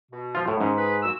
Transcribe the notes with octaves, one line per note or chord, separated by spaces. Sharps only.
B2
F3 F4
A2
G#2 D#3 C#4
G#4 B4
A#2 F#4 E6